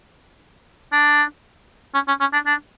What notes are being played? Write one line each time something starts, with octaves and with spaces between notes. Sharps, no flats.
D4
C#4
C#4
C#4
D4
D4